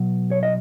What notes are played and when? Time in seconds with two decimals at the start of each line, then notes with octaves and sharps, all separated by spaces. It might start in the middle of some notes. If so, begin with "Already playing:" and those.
Already playing: B2 F#3
0.31 C#5
0.43 D#5